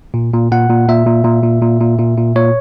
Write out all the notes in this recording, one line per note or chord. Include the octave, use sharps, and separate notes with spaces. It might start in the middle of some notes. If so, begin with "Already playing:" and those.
A#2
A#2
A#2 F#5
A#2
A#2 E5
A#2
A#2
A#2
A#2
A#2
A#2
A#2
A#2 C#5